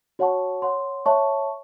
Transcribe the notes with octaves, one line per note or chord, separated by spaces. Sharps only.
F#4 C#5 F#5 A5 C#6
C#5 F#5 C6
C#5 E5 A5 C#6